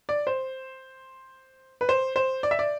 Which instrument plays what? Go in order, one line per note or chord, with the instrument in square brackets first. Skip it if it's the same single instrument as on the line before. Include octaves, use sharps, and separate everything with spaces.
[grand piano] D5
C5
B4
C5
C5
D5
E5
D5